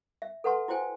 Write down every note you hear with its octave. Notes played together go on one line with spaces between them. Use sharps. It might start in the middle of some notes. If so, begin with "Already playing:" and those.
E5
A4 B4 F#5 A5 C6
E4 F#4 C5 G5 G#5